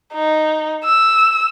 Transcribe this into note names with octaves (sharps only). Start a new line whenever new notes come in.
D#4
E6